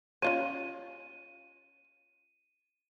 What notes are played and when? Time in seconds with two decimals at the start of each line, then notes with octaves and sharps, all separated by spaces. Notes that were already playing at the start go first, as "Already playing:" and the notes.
0.22 C#4 F4 C#5 D#7